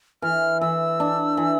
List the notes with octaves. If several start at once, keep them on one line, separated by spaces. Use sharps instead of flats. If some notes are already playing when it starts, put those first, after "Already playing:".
E3 F6
E3 E6
D4
E3